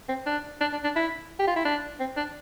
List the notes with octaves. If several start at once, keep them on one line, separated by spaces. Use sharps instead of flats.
C4
D4
D4
D4
D4
E4
G4
F4
E4
D4
C4
D4